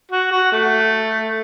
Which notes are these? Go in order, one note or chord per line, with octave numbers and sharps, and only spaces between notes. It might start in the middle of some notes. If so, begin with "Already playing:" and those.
F#4
F#4
A3